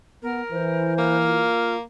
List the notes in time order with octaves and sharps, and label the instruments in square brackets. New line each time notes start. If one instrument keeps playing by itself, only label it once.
[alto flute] B3 [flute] A#4
[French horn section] E3 [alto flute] C5
[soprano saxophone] A#3 [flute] F6
[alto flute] F4